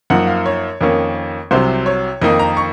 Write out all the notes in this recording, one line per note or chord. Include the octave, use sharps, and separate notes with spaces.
F#2 F3 A#3 D#4 F#5
F5
C#5
F2 D#3 A#3 C#4
C2 C3 F#3 C5
C#5
F2 D#3 A#3 D#4 D#5
A#5
C#6